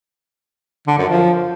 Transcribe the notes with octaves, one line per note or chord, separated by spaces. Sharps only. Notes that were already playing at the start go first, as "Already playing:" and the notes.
D3
F#2
F3